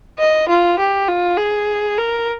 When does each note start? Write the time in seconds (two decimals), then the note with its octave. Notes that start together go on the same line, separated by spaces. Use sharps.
0.19 D#5
0.49 F4
0.79 G4
1.08 F4
1.38 G#4
1.98 A#4